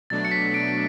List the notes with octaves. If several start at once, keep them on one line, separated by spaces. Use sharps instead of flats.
B2 F#3 A3 D4 A6
C#7
B6
D7